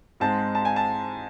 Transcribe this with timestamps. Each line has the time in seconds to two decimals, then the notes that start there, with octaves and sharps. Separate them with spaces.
0.20 G#2 G#3 C4 A5
0.55 A5
0.65 G#5
0.76 A5